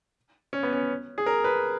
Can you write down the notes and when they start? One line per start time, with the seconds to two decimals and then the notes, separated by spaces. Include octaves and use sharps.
0.53 C#4
0.63 B3
0.73 C#4
1.18 G#4
1.26 A#4
1.44 B4